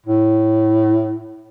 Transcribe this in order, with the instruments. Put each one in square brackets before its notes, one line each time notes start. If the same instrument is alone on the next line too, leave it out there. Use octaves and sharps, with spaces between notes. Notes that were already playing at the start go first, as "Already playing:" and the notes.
[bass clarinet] A2